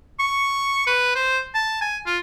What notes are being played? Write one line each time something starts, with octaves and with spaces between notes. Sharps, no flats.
C#6
B4
C5
A5
G#5
F4